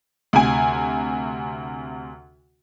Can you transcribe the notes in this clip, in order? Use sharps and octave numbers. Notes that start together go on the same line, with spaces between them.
D2 C3 G#5